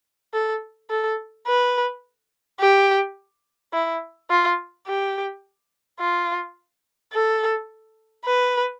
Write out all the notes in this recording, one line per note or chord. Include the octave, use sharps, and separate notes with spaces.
A4
A4
B4
G4
E4
F4
G4
F4
A4
B4